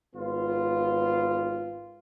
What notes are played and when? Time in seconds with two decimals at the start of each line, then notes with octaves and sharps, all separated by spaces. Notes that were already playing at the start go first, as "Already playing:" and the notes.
0.16 G#1 B3 F4